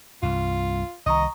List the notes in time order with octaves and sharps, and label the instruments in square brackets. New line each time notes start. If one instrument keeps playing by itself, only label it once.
[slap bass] C2 G2 [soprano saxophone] F4
[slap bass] C2 C3 D#3 [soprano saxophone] D#5 [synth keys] A#5 C#6 D#6